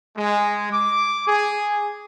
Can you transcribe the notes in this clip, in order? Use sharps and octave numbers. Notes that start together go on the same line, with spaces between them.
G#3
D6
G#4